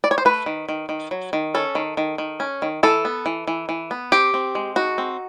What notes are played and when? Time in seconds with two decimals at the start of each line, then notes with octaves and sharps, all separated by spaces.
0.04 D5
0.11 C#5
0.18 C5
0.25 A3 B4
0.46 D#3
0.69 D#3
0.89 D#3
1.11 F#3
1.33 D#3
1.54 C#4 A4
1.75 D#3
1.97 D#3
2.18 D#3
2.40 C#4
2.62 D#3
2.83 E3 A4
3.05 B3
3.26 E3
3.47 E3
3.69 E3
3.91 B3
4.12 C4 G4
4.34 C4
4.55 G#3
4.76 D#4 F#4
4.98 C4